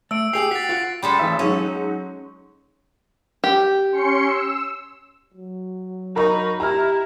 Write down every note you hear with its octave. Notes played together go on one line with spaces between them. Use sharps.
A3 E6 D7
G4 G#4 G5 E6 C7 F7
F#4 A6 B6
F4 F#5
G3 G#3 A4
A1 E3 E5
F#3 G#3 C#4 D#4
G4
C#4 C6 C#7
E6
F#3
D#4 A#4 B5 C#6
E4 G4 A#5 F6